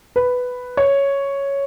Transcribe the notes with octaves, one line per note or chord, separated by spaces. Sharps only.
B4
C#5